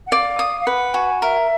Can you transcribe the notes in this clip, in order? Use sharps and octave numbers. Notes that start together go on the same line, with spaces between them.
F#5
D5 F5
D#6
F5
B4 F#5
F#4 G#5
A#4 E5